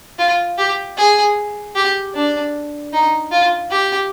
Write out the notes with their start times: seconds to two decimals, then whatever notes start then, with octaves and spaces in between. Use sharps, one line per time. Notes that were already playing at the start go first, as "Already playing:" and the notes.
0.19 F4
0.58 G4
0.97 G#4
1.75 G4
2.15 D4
2.93 D#4
3.32 F4
3.71 G4